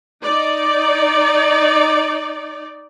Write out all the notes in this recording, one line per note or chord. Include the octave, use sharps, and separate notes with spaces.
D#4 D5